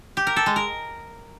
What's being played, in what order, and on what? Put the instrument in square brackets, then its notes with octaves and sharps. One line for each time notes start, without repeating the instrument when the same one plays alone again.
[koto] G4
A#4
A4
G#3
A#4